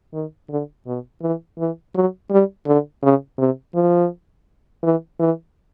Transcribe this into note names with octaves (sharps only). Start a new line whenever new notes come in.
D#3
D3
B2
E3
E3
F#3
G3
D3
C#3
C3
F3
E3
E3